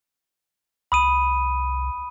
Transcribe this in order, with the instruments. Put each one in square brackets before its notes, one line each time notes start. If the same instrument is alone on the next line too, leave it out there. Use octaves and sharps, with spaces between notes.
[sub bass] C2 [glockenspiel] B5 D#6 D#7